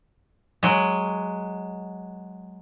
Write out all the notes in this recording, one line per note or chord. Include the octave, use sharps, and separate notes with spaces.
F#3 G#3